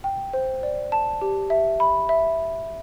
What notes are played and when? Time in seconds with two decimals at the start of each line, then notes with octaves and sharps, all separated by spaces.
0.04 G5
0.33 C5
0.63 D5
0.92 A5
1.21 G4
1.50 E5
1.80 B5
2.09 E5